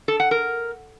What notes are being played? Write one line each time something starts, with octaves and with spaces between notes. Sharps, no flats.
A4
F#5
A#4